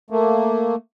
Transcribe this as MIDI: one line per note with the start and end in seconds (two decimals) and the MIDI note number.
0.10 0.75 57
0.10 0.75 58